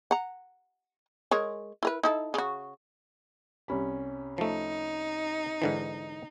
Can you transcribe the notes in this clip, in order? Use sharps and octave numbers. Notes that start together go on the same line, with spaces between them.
F#5 A#5
G#3 A#4 C#5
E4 A#4 B4
D#4 E4 A4
C#3 F#4
C2 C#4 B5
F3 A3 D#4
G#2 D3 E3